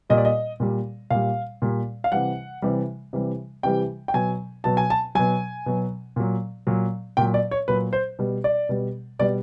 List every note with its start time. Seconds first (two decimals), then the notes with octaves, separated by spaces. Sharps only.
0.10 A#2 G3 D#5
0.18 D5
0.25 D#5
0.60 A#2 G3
1.10 A#2 G3 F5
1.62 A#2 G3
2.04 F5
2.12 C3 E3 G3 F#5
2.62 C3 E3 G3
3.13 C3 E3 G3
3.63 C3 E3 G3 G5
4.08 G5
4.14 B2 F#3 G#5
4.64 B2 F#3 A5
4.77 G#5
4.90 A5
5.15 B2 F#3 G#5
5.66 B2 F#3
6.16 A#2 F#3
6.67 A#2 F#3
7.17 A#2 F#3 G5
7.34 D5
7.51 C#5
7.68 A#2 F#3 B4
7.93 C5
8.19 B2 G3
8.44 D5
8.69 B2 G3
9.19 B2 G3 D5